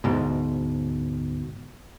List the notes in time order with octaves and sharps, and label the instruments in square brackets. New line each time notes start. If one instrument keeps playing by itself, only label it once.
[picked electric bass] D2 G#2 B2